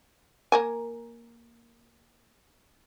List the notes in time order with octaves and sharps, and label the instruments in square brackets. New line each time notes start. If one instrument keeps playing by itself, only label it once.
[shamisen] A#3 A#4 G#5